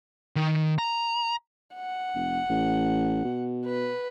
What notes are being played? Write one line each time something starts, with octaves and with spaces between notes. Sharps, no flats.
D#3
A#5
F#5
F1
A1
B2
B4